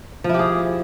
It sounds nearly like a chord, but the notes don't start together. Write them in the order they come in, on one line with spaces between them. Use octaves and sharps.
F3 E4 G4 G#4